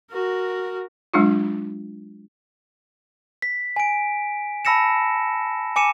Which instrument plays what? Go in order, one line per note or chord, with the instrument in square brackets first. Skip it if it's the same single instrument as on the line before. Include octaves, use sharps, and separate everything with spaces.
[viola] F#4 A#4
[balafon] F#3 G#3 D4 D#4 F4
[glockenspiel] B6
G#5 D7
A5 B5 E6 A#6 C#7 E7
G#5 D6 C#7 D#7 E7